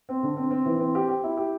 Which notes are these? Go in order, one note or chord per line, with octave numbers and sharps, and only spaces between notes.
C4
D3
C4
C4
E3
C4
G4
G4
E4
G4